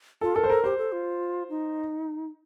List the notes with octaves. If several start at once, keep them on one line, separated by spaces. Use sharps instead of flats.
F4 A4
A4 A#4
C5
A4 A#4
G4 C5
A4
F4
D#4